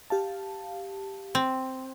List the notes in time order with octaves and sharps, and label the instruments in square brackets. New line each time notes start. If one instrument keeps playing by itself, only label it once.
[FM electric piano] G4 F5 A5
[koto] C4